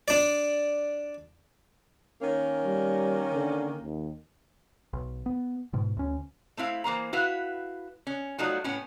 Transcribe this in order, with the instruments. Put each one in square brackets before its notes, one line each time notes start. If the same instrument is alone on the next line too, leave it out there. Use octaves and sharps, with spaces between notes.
[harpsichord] D4 D5
[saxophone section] D#3 A#3 C#4
[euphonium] G3
D3
D#2
[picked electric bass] B1
B3
G#2 B2
D2 C#4
[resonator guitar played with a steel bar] A3 C4 E4 F5
E3 A#3 C5 A#5
E4 F#4 B4 F5
C#4
F#3 G3 A3 D#4 F4 F#4
A2 B3 C#4